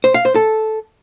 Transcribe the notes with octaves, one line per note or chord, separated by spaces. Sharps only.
C5
F5
C5
A4